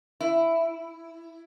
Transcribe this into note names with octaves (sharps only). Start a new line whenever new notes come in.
E4